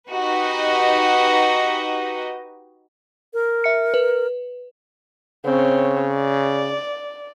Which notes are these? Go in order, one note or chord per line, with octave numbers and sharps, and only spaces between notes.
D#4 F#4 G4 B4 D#5
A#4
E5 C#7
B4
C#3 C4 C#5
D5